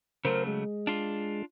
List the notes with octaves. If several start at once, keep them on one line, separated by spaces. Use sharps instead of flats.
C#3 F#3 A3 A#4 C5
G#3
D4 F4